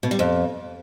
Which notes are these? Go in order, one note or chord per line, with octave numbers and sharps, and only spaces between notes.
B2
G3
F2